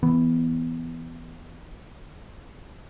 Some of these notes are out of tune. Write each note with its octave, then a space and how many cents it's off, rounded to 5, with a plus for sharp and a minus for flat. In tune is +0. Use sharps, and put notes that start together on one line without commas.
E3 +0 B3 +0